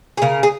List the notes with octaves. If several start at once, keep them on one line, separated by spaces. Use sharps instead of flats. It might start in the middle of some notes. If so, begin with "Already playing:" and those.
G#4
C#3 A#4
G#4